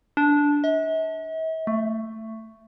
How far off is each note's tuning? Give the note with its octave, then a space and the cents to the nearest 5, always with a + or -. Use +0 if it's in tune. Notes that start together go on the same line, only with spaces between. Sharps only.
D4 -10
E5 -45
A3 +15